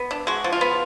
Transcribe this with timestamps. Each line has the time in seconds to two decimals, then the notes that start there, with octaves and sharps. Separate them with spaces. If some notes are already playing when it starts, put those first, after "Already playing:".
Already playing: B3
0.11 D4
0.27 G#3 F#4
0.44 F3
0.52 F4
0.61 B3